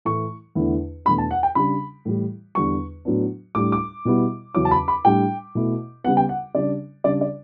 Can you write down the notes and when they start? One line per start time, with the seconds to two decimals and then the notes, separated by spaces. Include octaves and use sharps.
0.05 A2 E3 A3 E4 C#6
0.55 E2 D3 A3 E4
1.05 E2 B2 A3 D4 B5
1.18 A5
1.31 F#5
1.43 G5
1.55 C#3 G3 D4 B5
2.05 A2 E3 G3
2.55 E2 D3 G3 B3 D4 C#6
3.05 A2 F#3 B3 D4
3.55 A2 G3 D4 D6
3.72 D6
4.05 B2 G3 B3 E4
4.55 E2 C#3 F#3 C#4 E4 D6
4.65 A5
4.71 B5
4.88 B5
5.05 A2 G3 D4 G5
5.55 B2 A3 E4
6.04 C#3 G3 B3 F#5
6.17 G5
6.29 F#5
6.54 C#3 G3 D4 D5
7.04 C#3 G3 D4 D5
7.21 D5